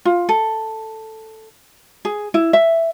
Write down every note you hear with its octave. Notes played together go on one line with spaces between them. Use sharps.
F4
A4
G#4
E4
E5